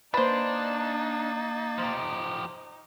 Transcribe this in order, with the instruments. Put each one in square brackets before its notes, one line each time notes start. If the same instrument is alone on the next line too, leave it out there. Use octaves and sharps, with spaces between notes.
[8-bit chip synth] A#3 A6 [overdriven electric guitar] D4 [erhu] D#4 [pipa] B4 C5
[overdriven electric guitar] F3 G4